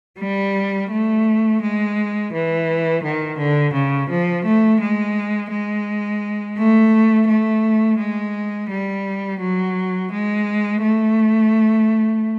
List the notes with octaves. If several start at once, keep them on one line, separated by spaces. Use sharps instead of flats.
G3
A3
G#3
E3
D#3
D3
C#3
F3
A3
G#3
G#3
A3
A3
G#3
G3
F#3
G#3
A3